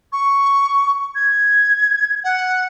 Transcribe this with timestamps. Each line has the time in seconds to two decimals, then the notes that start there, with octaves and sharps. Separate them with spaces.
0.13 C#6
1.15 G#6
2.24 F#5